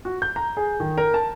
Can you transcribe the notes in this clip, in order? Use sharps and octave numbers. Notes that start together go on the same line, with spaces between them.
F#4
G6
A#5
G#4
D#3
A#4
A5